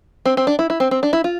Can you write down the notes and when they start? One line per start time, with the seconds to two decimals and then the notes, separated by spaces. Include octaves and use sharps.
0.26 C4
0.37 C4
0.47 D4
0.59 E4
0.70 E4
0.80 C4
0.91 C4
1.03 D4
1.13 E4
1.24 F4